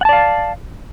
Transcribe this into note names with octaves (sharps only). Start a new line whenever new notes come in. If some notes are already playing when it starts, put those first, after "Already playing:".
D5 F5 F#5 A5